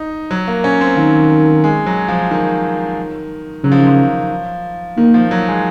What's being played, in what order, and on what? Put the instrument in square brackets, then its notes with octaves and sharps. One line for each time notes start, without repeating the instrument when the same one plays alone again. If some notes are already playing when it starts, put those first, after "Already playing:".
Already playing: [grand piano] D#4
F#3
A#3
C#4
C4
[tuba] D#3 [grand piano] A#3
[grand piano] G#3
F#3
F3
D#3
[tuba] C#3 [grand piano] F#3
[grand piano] F3
D#3
F3
[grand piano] D#3 [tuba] A#3
[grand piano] F3
F#3
G#3